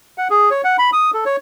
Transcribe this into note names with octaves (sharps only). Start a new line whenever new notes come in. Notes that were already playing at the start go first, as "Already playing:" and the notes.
F#5
G#4
C#5
F#5
B5
D#6
A4
C#5